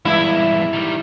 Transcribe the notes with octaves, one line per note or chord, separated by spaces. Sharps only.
E2 G2 E3 G#3 E4 E5 F5
D#3 G3